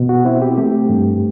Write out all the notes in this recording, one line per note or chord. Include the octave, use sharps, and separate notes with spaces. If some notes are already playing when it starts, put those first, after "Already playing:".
Already playing: B2
F#4
C4 E4
G4
A3 G4
G2